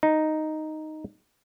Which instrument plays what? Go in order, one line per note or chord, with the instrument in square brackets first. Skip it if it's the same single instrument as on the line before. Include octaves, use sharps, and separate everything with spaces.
[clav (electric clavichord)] D#4